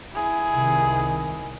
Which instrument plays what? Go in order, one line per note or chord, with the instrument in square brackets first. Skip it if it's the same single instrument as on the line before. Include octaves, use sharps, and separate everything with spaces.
[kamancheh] E4 G#4
[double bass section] C2 C3 D#3